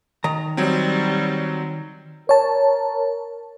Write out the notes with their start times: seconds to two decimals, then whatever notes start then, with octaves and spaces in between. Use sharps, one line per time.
0.24 D#3 A#5
0.57 F#3 G3 C4
2.29 A#4 C#5 A5